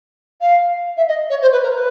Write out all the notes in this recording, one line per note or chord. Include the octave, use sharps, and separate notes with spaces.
F5
E5
D#5
C#5
C5
B4
A#4
B4